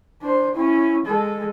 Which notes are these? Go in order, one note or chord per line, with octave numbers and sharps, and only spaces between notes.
D4 C5
C#4 E4
G#3 A4